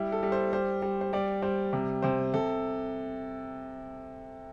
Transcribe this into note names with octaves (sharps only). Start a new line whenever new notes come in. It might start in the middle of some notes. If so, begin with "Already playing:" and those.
Already playing: G3 E4
A4
G3
C5
G3 C5
G3
C5
G3 D5
G3 C5
C3
C3 C5
C3 A4